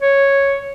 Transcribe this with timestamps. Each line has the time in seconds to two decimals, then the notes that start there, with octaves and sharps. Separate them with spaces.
0.02 C#5